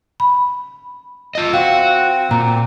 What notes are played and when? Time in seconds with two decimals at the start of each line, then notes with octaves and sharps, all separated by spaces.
0.20 B5
1.35 F4 D#5
1.53 C4 F#4 F5
2.31 A#2 A#5